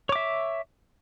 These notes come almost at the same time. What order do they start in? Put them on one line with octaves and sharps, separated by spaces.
C#5 D6 E5